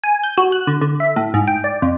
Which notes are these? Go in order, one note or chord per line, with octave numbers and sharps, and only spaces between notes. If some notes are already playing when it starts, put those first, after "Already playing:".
G#5
G6
F#4
F#6
D3
D3
E5
A2
G#2
G5
D5
F2